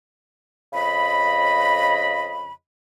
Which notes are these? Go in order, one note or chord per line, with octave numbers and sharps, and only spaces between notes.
F2 C#3 D#5 B5